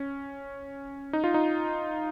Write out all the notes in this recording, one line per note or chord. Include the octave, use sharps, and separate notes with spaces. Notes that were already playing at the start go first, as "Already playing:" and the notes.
Already playing: C#4
D#4
F4
D#4